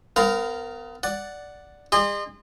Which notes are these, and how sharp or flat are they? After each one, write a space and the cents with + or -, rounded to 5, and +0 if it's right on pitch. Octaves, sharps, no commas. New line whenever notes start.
B3 +35 A#4 -10 F5 +0
D5 +0 F#5 +0
G#4 -40 D#5 -40 C6 +0